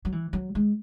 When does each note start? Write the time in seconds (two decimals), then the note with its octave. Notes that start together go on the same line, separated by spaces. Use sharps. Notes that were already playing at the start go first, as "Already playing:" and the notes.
0.05 F#3
0.12 E3
0.33 F#3
0.55 G#3